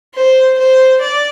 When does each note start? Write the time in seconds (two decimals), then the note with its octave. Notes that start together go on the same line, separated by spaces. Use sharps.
0.15 C5
0.58 C5
1.01 D5